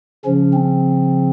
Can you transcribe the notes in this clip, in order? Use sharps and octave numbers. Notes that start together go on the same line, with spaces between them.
C#3 F3 C#4
C4